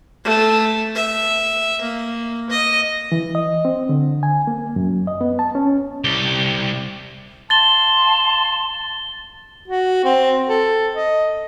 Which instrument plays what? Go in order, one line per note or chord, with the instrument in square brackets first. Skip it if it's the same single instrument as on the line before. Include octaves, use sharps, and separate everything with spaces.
[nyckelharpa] A3
E5
A#3
D#5
[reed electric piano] E3
D#5
C4
D3
G#5
A#3
F#2
D#5
B3
A5
C#4
[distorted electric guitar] C2 G4
[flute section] F5 A5 C6 [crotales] A6 G7
[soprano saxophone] F#4
C4
A4
D#5